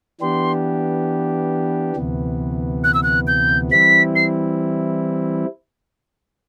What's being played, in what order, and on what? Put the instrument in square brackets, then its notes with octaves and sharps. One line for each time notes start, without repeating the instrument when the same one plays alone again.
[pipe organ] E3 B3 D4 G4 [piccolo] C6
[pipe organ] D2 C3 E3 B3
[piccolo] F#6
E6
F#6
G6
[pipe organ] E3 G3 C4 E4 [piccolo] B6
[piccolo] C7